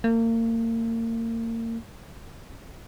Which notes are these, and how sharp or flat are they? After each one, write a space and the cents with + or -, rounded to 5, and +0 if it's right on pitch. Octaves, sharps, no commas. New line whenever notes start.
A#3 -35